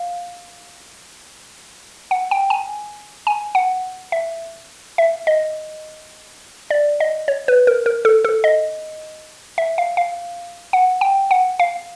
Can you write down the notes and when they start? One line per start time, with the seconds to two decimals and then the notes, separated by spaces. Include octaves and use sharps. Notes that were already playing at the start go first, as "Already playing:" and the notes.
Already playing: F5
2.11 F#5
2.31 G5
2.50 G#5
3.27 G#5
3.55 F#5
4.12 E5
4.98 E5
5.27 D#5
6.70 D5
7.00 D#5
7.28 C#5
7.48 B4
7.67 A#4
7.86 A#4
8.05 A4
8.25 A4
8.44 D#5
9.58 E5
9.78 F5
9.97 F5
10.73 F#5
11.01 G5
11.31 F#5
11.60 F5